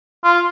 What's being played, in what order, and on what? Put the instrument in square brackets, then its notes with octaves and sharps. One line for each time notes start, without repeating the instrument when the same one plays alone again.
[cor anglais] F4